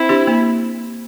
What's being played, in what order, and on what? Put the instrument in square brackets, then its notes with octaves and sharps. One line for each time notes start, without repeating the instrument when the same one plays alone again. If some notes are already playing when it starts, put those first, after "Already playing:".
Already playing: [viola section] C4 E4
[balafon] D4 G4 C5
A#3